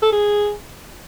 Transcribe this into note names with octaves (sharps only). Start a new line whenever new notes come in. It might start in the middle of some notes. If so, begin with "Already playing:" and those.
A4
G#4